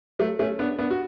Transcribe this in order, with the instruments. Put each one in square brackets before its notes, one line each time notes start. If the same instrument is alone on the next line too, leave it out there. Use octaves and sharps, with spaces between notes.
[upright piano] F#3 A3
A3 C#4
B3 D4
B3 D4
F#4